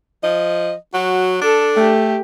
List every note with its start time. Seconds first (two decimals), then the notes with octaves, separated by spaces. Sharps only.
0.24 F3 D#5
0.94 F#3 F#4
1.42 D4 A4
1.77 A3 G4